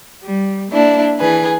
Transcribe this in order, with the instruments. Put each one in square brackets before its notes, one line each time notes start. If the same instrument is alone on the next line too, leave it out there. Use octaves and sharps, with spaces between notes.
[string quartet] G3
A#3 D4 E4
E3 G#4 B4